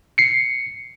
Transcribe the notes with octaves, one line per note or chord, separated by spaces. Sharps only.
C7 C#7